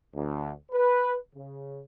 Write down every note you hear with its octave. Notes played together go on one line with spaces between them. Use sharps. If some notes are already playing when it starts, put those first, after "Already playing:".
D2
B4
C#3